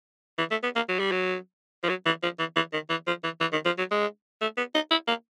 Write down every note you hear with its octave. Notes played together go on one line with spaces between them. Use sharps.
E3
A3
B3
A#3
F#3
G3
F#3
F3
F#3
E3
F3
E3
E3
D#3
E3
F3
E3
E3
D#3
F3
F#3
G#3
A3
B3
D#4
E4
A#3